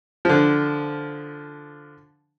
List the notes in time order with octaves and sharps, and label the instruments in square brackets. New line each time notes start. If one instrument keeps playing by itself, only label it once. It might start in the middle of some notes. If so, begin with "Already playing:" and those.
[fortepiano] D3 F3